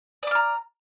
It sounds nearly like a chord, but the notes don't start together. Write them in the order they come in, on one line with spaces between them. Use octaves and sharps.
D5 D6 F6 A#5